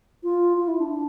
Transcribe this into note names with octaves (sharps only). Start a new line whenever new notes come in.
F4
F4
E4
D4
D4